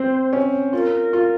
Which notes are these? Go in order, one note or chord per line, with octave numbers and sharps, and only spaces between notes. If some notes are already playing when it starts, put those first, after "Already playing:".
Already playing: C4 C5
C#4
F4 A#4
F4